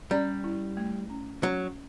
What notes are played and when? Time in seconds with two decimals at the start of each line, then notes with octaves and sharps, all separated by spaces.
0.11 G3 C#4
0.44 E4
0.77 A3
1.10 C#4
1.43 F#3 C#4